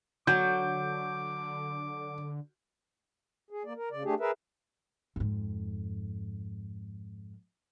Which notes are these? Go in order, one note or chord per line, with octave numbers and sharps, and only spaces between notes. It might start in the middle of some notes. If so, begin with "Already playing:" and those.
D3 F#3 D6 G6
G#4
A#3 D5
A#4
C#3 D5
A3 D4 G4 G#4
G#4 A#4 B4 E5
F2 G#2